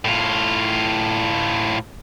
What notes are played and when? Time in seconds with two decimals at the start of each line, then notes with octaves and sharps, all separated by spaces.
0.05 A2 F4